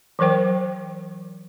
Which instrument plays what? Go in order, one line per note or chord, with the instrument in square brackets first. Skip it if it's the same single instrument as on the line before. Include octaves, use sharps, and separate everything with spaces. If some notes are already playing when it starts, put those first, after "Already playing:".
[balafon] E3 F#3 A#4 C5 G5